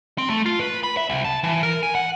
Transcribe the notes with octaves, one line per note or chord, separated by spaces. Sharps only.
C4
A3
F4
B4
B5
E5
C2
A5
E3
A#4
G#5
F#5